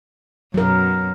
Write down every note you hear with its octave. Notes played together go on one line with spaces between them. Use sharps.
F#2 B2 F#3 A#4